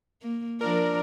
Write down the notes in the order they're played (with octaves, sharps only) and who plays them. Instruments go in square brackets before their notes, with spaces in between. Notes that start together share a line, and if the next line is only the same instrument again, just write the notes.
[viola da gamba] A#3
[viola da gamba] F3 D4 D5 [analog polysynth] A#4